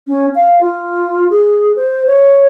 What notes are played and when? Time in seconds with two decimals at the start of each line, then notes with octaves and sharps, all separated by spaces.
0.07 C#4
0.35 F5
0.61 F4
1.30 G#4
1.76 C5
2.07 C#5